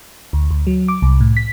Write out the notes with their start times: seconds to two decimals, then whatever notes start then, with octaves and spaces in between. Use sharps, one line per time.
0.33 D2
0.51 D2
0.67 F#3
0.88 D6
1.02 C2
1.21 A2
1.37 B6